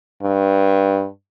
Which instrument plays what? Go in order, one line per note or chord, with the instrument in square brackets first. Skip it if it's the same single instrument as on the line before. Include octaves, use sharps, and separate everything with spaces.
[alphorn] G2